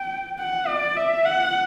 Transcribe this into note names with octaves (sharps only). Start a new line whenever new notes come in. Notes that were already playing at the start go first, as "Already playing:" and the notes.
Already playing: G5
F#5
D5
E5
F#5